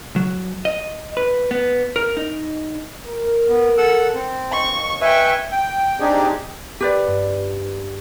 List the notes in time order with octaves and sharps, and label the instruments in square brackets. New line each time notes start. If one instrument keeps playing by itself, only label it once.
[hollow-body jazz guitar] F#3
D#5
B4
B3
A#4
D#4
[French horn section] A#4
[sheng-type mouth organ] B3
A4 F#5 E6
C4
[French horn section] D#2 D#5 [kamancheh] C#6
[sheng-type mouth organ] B4 G#5 C#6 [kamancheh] E5 G5
[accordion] G5
C4 D4 D#4 G4 G#4
[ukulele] G4 B4 D5
[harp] G2